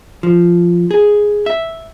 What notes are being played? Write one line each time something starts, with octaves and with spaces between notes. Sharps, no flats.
F3
G#4
E5